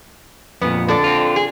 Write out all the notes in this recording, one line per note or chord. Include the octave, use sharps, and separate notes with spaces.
F2 A#2 B3
D3 A4 D5
C4 F4
G#4